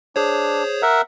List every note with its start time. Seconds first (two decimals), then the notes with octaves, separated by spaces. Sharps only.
0.16 D4 G#4 C5 C#5
0.82 A#4 E5 F#5